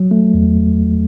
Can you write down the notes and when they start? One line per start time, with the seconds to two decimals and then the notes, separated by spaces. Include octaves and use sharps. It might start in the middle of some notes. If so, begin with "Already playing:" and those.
Already playing: F#3
0.11 A3
0.34 E2